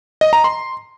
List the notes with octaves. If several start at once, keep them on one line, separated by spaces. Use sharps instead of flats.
D#5
A#5
C6